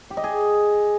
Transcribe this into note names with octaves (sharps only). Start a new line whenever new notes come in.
G4
D#5
G#4